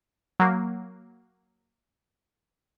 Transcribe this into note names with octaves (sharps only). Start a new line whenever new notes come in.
F#3 A#3